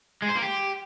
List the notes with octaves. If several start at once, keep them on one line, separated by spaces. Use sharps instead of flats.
G#3
C5
A#3
G4